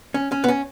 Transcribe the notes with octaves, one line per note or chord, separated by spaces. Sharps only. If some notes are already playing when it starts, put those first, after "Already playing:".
C#4
C#4
B3
C#4